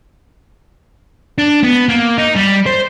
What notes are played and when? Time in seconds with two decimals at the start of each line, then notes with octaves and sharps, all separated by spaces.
1.38 D4
1.63 B3
1.89 A#3
2.18 D#4
2.36 G3
2.66 C5